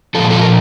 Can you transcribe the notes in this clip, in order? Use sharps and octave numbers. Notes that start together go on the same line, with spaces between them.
A#2 F3 F4 A4
F4 A4
A#4